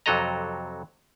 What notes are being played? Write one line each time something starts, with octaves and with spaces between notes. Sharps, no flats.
F2 C3 F#3 A4 D#5 A#5